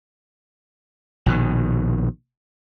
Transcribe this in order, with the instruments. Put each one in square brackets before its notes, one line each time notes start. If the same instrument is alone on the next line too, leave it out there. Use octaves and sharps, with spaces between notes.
[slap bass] A#1 B2 D#3